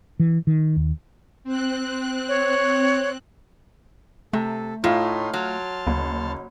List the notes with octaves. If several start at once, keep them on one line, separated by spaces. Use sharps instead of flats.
E3
D#3
D#2
C4 F#6
C#5
C3 A3 A4
A2 D#4 F4 C#5 C6
F#3 A5 C6 F6
F#1 D2